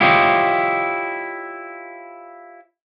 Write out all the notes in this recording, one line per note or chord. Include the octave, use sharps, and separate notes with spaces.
E4 F4 G4 C5 C#5 D#5